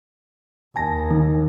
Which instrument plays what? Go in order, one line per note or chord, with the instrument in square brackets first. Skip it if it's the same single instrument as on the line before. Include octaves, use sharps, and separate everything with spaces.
[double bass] D#2 [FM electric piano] G#5 A5 A#6
[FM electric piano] D#3